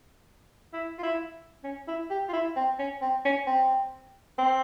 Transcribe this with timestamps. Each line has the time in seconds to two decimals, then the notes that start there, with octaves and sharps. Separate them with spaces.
0.73 E4
0.98 F4
1.03 E4
1.64 C#4
1.88 E4
2.10 G4
2.29 F4
2.33 E4
2.56 C4
2.79 C#4
3.01 C4
3.25 C#4
3.47 C4
4.38 C4